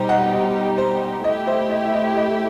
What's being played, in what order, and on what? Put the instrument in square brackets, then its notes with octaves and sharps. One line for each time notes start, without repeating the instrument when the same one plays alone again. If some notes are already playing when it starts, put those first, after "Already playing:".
Already playing: [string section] B2 G3 D#4 G4 [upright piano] C5
[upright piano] D#5 F#5
D#5
C5
[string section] A3 E4 G4 [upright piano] D#5
[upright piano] C5 E5
D#5
E5
D#5
D#5